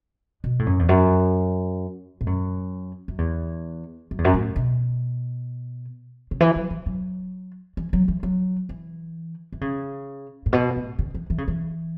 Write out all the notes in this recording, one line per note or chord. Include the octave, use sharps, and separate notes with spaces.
B2
A2
F#2
E2
F#2
A2
F#2
F#2
E2
F#2
E2
F#2
A2
B2
C#3
E3
F#3
E3
F#3
E3
F#3
E3
F#3
E3
E3
C#3
A2
B2
A2
C#3
E3
E3
C#3
E3